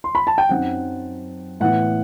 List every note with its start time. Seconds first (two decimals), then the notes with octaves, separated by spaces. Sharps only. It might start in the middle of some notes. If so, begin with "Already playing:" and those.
0.04 C6
0.15 B5
0.27 A5
0.38 G5
0.49 F#2 F#3 C4 D#4 F#5
1.60 A2 E3 B3 E4 F#5